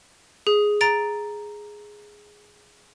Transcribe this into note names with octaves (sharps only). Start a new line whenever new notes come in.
G#4
A#5 A6 D7